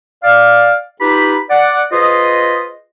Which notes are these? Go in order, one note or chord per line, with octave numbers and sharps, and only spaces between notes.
D5 F5
D#4 F4 G4 B4 B5
D5 F#5
F4 G#4 B4 C5 D#5